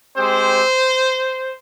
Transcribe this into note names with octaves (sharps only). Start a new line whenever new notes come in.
G#3 C4 G4 C5